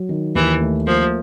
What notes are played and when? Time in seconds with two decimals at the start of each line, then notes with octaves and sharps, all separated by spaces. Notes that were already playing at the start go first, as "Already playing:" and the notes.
Already playing: F#3
0.09 D#3
0.35 D#2 E3
0.61 A3
0.87 F3 A#3